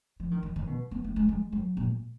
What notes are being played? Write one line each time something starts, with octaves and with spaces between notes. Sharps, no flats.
F3
D#3
D#3
D#3
B2
B3
A#3
G#3
G#3
F#3
A#2